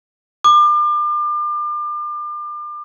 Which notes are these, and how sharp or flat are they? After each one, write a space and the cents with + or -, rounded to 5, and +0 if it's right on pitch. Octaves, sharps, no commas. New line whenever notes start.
D6 +35